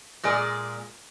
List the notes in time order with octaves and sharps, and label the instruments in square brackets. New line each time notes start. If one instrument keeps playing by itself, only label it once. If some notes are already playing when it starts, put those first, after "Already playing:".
[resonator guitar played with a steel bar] A#2 G#3 G#4 D5